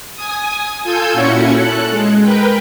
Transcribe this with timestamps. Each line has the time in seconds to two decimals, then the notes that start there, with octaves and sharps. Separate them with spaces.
0.15 G#5 D#6
0.83 F4 A4 G#5 E6 G6 G#6
1.13 A#2 C#4 E4 F#4 C#5 C#7
1.54 A4 F#6
1.90 G#3
2.22 A#4 B4 G5